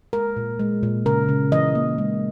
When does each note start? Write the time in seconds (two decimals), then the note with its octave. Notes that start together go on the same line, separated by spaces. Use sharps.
0.13 G#3 A#4
0.37 A#2
0.59 G#3
0.83 A#2
1.06 C#3 A#4
1.29 C#3
1.52 E3 D#5
1.75 A#3
1.98 G#3